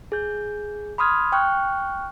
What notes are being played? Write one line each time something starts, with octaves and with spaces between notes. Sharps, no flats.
G#4 G6
B5 C6 D#6 F6 G#6
G5 C#6 F6 F#6